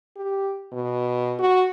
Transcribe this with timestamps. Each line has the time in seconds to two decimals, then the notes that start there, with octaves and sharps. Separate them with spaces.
0.17 G4
0.72 B2
1.39 F#4